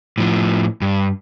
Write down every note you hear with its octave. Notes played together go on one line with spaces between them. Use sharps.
A2 F3
G2